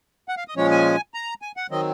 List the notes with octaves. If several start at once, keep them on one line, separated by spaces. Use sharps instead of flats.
F#5
F5
D#5
A#2 F3 G#3 C#4 C#5
G#5
A#5
G#5
F#5
D#3 F#3 C4 D#5